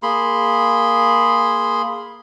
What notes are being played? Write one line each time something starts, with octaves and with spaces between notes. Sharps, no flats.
A#3 G#4 B5 C6